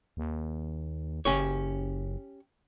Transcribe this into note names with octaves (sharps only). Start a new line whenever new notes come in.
D#2
F#1 C#4 G4 C#5